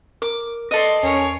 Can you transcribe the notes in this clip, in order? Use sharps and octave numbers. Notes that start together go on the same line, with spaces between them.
A#4 D6
A4 B4 D5 D#5 C6
E2 C#4 A#4 C#5 C7